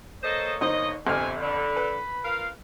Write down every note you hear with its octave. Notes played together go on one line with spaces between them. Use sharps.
A#3 A4 A#4 C5 C#5 D#5
G1 D#4 C5 D#5
G1 F2 C3 E5 G#5 F6
D3 B5
B4
F4 A#4 F5